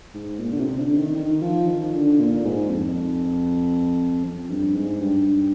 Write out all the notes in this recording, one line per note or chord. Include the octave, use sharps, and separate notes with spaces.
G#2
A#2
D3
C3
D3
D#3
D#3
F3
D#3
D3
A#2
G#2
F2
F2
G2
G#2
G2